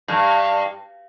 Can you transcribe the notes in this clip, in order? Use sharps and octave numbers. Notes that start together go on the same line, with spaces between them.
G2